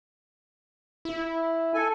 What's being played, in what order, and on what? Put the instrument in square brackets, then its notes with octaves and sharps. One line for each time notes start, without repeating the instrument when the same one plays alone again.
[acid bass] E4
[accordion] A4 G#5